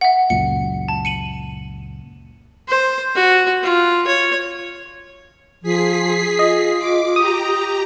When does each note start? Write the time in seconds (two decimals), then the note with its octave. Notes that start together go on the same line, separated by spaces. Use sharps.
0.01 E5 F#5
0.30 C#2 F#2 A#2 C#7
0.88 A5
1.05 C#7 D#7 F#7
2.68 C5
3.15 F#4
3.63 F4
4.07 C#5
5.63 F3 G#4 B6 C7
6.39 F4 D#5
6.79 D6
7.16 G4 A#5 D#6